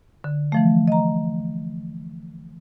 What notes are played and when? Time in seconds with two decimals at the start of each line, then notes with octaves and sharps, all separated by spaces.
0.24 D3
0.52 E3 F3 A3
0.88 D#5 A#5